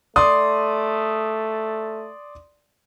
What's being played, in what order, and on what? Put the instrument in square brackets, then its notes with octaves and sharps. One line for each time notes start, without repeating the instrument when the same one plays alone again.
[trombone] A3 [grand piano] D5 C6 D#6